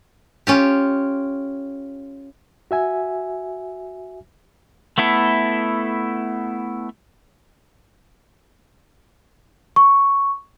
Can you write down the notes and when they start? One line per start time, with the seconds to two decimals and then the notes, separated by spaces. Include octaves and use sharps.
0.47 C#4 F4 G4
2.71 F#4 E5 G#5
4.98 A3 B3 E4 A4
9.76 C#6